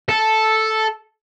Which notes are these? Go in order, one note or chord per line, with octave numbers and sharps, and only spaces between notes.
A4